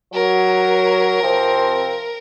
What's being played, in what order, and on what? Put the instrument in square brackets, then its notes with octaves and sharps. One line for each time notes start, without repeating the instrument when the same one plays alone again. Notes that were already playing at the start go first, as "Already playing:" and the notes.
[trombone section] F#3 [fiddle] A#4
[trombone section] C3 F3 C4